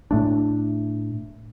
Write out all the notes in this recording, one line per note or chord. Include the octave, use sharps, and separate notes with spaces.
A2 A3 D4